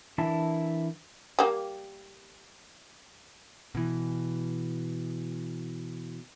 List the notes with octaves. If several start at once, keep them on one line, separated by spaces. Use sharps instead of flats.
E3 D4 E4 A#4 E5 A5
G3 A#3
B2 E3